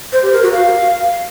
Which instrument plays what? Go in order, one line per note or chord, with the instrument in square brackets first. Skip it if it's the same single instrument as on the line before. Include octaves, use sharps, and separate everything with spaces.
[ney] C5
G4
A#4
F#4
F5